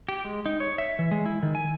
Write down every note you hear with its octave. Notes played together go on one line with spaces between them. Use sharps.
G4
G#3
D#4
C#5
E5
E3
G#3
E4
D#3
G#5